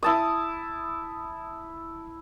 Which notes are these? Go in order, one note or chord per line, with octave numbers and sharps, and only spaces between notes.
E4 A5 D#6